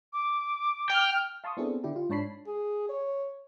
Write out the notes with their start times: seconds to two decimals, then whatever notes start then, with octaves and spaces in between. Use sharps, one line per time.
0.13 D6
0.90 G5 F6
1.44 F5 A5 C6 C#6 D#6
1.57 B3 C4 D4 E4 G#4 A4
1.84 D3 D4 E4 G4
1.96 F4
2.10 G#2 D4 C#5 A5 B5 C7
2.47 G#4
2.89 C#5